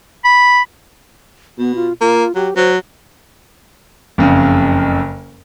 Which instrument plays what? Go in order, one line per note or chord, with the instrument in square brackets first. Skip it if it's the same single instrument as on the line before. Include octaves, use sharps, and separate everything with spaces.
[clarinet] B5
[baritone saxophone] B2 [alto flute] B3
[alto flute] F4
[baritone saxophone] A#3 [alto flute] F4
[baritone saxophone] F#3 [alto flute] G4
[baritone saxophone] F#3 [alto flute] C5
[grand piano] F#1 F2 C#3